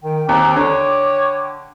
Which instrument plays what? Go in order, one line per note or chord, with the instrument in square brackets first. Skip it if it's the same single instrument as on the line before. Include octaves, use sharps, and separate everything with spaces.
[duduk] D#3 [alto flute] G5
[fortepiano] D#2 [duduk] C4 [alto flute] A#5 [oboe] D6
[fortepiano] D3 [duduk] C#5 [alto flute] G5